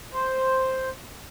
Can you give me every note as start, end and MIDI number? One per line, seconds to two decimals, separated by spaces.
0.14 0.89 72